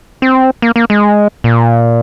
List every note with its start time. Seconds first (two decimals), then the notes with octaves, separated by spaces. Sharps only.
0.22 C4
0.62 A#3
0.76 A#3
0.90 G#3
1.44 A#2